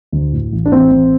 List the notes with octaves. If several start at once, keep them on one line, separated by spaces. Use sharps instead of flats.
D2
A2
A1
D4
A1 C4
A1